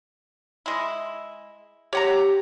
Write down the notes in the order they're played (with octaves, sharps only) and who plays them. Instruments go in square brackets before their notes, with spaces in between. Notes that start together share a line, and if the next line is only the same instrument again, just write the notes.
[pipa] G#3 E4
[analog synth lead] G4 [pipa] C#5 F#5 A#5